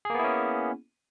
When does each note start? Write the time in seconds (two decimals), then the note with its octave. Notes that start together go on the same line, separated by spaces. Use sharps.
0.05 G#4
0.10 A#3
0.15 B3
0.19 E4
0.24 C#4